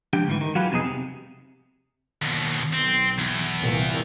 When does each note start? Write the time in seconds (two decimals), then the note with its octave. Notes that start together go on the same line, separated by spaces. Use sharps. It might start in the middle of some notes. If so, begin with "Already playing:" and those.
0.13 C#2 F3 D4 G4 G5
0.27 D2 G#2 D#3 E3
0.41 D#3
0.55 F#3 F4 G4 G#4 B4
0.71 C2 F2 B2 D#4 G#4
0.84 C3
2.22 D#2 B2
2.73 B1 C4
3.18 E2
3.61 C2 A#2 E3